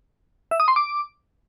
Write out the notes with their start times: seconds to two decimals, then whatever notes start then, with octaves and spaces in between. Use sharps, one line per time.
0.51 E5
0.60 D#6
0.68 C6
0.76 D6